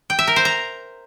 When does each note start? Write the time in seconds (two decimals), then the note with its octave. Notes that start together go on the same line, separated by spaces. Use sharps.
0.10 G5
0.19 E5
0.27 A#4
0.36 C5
0.45 A#5